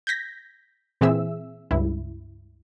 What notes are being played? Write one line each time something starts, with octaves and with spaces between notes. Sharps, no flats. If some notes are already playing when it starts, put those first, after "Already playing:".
G6 G#6 A#6 B6
A#2 E3 C4 G#4 E5 E6
C#2 G2 E4